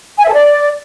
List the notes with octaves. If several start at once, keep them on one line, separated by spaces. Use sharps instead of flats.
G#5
E5
A4
D5